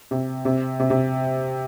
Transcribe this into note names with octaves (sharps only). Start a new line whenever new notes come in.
C3
C3
C3
C3